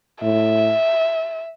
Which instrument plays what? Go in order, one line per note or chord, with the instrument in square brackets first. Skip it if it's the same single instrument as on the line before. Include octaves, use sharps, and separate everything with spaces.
[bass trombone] A2 [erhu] E5